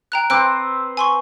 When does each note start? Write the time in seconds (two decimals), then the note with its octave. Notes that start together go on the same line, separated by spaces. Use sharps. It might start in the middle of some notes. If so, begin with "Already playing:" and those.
0.12 G5 A#5 F#6
0.30 C4 B4 C5 D6 F#6 D7
0.97 G#5 C6 C#6